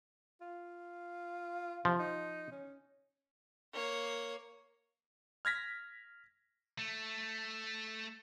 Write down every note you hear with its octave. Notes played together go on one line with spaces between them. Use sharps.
F4
C3 F3
D#4
C#4
A#3 C#5
F6 G#6 A#6 B6
A3